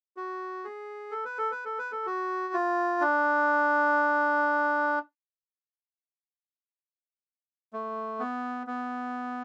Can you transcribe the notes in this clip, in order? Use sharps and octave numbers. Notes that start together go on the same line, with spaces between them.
F#4
G#4
A4
B4
A4
B4
A4
B4
A4
F#4
F4
D4
A3
B3
B3